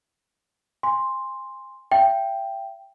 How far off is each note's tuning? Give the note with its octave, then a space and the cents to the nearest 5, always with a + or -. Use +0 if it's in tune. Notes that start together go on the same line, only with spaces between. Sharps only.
G#5 -20 C6 +0
E5 +35 G5 +0